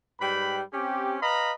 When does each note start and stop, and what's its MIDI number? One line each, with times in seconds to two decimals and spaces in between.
0.21 0.62 44
0.21 0.62 55
0.21 0.62 71
0.21 0.62 79
0.21 0.62 83
0.73 1.16 60
0.73 1.16 61
0.73 1.16 67
1.22 1.53 71
1.22 1.53 75
1.22 1.53 77
1.22 1.53 82
1.22 1.53 83